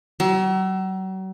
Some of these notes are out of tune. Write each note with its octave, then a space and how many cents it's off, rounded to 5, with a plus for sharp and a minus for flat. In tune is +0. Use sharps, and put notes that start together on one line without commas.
F#3 +40